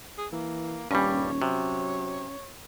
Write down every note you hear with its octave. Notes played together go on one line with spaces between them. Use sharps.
G#4
E3 A#3
D#1 G2 G3 C#4 C#5
C3 F#3